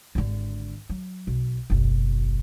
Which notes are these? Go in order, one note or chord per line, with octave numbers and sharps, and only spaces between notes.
G#1 D3
F#3
B1
F#1 B1